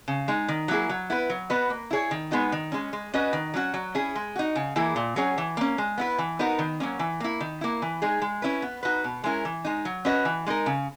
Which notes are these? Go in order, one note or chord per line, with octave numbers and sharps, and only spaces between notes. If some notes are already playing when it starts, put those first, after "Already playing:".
C#3
G#3 D#4
D#3
F#3 A#3 E4 G#4
F#3
B3 E4 B4
F#3
B3 F#4 B4 D#5
A#3
E4 G#4 C#5
D#3
G#3 B3 D#4 F#4
D#3
G#3 C#4
G#3
C#4 F#4 B4 D#5
D#3
F#3 C#4 F#4
F#3
C#4 E4 G#4
G#3
D#4 F#4
C#3
E3 A#3 E4 G#4
A#2
F#3 C#4 G#4 C#5
E3
A#3 C#4
G#3
B3 E4 B4
E3
B3 D#4 F#4 A#4
D#3
F#3 A#3 C#4
E3
A#3 E4
D#3
A#3 E4
E3
G#3 D#4 G#4
G#3
C#4 E4 B4
B3
D#4 F#4 B4
B2
G#3 C#4 E4 A#4
E3
G#3 D#4
F#3
C#4 F#4 B4 D#5
E3
G#3 D#4 A#4
C#3